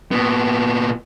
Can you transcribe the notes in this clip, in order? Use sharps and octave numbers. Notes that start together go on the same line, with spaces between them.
A#2 B3